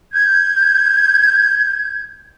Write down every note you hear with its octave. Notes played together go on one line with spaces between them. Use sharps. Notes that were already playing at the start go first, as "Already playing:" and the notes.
G6 G#6